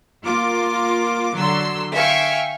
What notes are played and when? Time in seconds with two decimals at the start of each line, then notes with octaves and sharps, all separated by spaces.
0.25 A#3 F4 D6
1.37 D3 F#3 C6 E6
1.92 E5 F5 G5 G#5 C#6